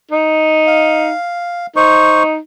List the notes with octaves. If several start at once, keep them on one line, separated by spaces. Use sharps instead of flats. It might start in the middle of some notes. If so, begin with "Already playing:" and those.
D#4
F5
D#4 C5 C#6